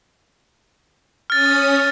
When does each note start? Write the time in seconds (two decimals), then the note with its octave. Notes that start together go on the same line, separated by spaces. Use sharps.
1.30 C#4 D#6 F6 A6